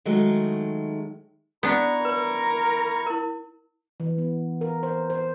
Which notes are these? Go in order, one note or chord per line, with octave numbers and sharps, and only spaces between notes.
D#3 F#3 G#3 A3
B3 D4 E4 A#5 C#6
A#4 B4 C#5
E4 A#4
E3
B3
A#4
C5
C5